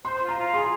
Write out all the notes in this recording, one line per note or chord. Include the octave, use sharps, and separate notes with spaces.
C5 C6
F4
A#5
F4
G#4 C6